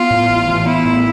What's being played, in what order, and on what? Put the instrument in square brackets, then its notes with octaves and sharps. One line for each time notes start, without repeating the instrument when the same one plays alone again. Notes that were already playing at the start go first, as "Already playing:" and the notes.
Already playing: [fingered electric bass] B3 [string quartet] F4
[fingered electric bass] A2
A1
E3
[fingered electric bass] B3 [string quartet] E4
[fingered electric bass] A2